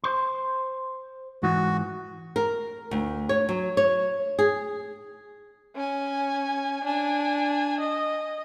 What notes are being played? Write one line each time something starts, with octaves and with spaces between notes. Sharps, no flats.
C5 C6
G#2 E3 F#4
A#4
D2
C#5
F#3
C#5
G#4
C#4 G#5
D4 G#5
D#5